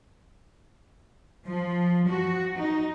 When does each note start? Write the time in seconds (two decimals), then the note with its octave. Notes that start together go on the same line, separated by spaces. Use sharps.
1.48 F3
2.08 F#4
2.58 D#4